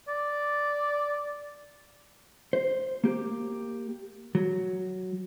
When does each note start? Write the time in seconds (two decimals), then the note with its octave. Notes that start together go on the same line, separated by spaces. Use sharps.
0.08 D5
2.53 C5
3.04 A#3 G4
4.35 F#3